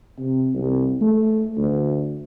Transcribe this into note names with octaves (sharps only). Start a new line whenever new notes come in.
C3
C2
A3
D2